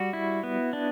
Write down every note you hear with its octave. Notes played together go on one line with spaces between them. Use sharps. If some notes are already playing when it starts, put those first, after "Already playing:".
Already playing: G3 F#4
E4
B3
D4